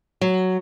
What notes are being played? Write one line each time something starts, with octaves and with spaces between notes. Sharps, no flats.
F#3